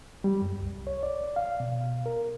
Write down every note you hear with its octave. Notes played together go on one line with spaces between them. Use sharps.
G3
F#2
C2
C#5
D5
F5
B2
A#4